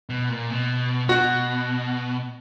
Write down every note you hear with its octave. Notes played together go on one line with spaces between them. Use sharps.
B2
A#2
B2
B2 F#4